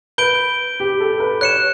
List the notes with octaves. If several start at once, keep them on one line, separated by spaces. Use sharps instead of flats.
B4 G6 D7 G7
G4
A4
B4
C#5 F#6 C#7 E7